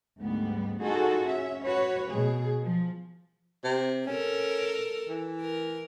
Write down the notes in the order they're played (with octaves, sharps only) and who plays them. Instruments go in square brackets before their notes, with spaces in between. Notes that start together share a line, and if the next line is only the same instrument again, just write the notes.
[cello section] D2 G#2 G3 B3
D#4 F4 F#4 G#4 A4
C#4 E5
F#4 B4 C#5
B2 G#4
F3
[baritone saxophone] C3
[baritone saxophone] C#4 [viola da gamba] A4 A#4
[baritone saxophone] E3
[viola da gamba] A#4